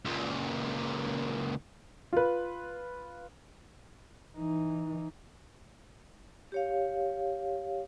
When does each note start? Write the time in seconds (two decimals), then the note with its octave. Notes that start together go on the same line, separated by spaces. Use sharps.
0.05 C#2 A#2
2.13 F4 B4
4.37 E3 D#4
6.52 G4 C#5 F5